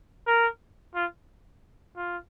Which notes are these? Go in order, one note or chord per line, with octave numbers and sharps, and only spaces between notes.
A#4
F4
F4